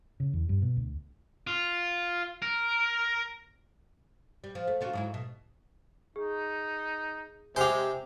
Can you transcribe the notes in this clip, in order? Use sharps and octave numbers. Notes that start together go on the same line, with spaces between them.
C#3
E2
G2
B2
D2
F4
A#4
G3
F3
A3
D3 F4 F#4
G#2 F#3 E4
B2
D#4 G#4
C3 G#3 G4 C5 G#5 F7